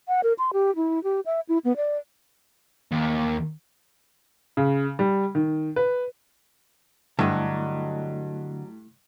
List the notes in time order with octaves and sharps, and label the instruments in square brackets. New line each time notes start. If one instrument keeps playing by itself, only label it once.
[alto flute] F#5
A#4
C6
G4
E4
G4
E5
E4
B3
D5
[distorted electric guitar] D#2
[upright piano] C#3
G3
D#3
B4
[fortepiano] G2 [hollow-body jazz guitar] D3 [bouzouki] F#3 D#5 [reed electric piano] A3 E4